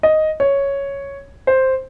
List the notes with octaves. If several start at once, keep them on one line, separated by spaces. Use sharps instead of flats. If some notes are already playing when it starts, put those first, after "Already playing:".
D#5
C#5
C5